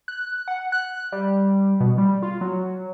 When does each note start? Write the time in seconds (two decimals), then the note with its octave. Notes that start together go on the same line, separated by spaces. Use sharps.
0.08 F#6
0.48 F#5
0.72 F#6
1.12 G3
1.80 B2
1.98 G3
2.23 F4
2.41 F#3